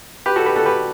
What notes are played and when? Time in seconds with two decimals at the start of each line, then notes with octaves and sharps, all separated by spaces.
0.26 G4 B4
0.36 F#4 A4
0.46 G4 B4
0.56 F#4 A4
0.66 G4 B4